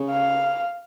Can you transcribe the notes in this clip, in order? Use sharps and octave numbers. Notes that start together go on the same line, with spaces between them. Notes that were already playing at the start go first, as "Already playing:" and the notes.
Already playing: C#3
F5